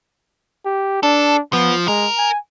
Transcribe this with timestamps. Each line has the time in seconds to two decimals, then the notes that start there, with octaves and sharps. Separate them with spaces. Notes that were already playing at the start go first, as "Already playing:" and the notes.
0.65 G4
1.03 D4 A4
1.53 F3 B3
1.88 G#3 A#4
2.18 G#5